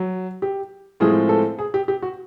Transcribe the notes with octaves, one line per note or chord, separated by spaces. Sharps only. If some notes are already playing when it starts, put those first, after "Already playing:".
Already playing: F#3
G4
A2 F3 G#3 C4 G#4
A4
G#4
G4
G4
F#4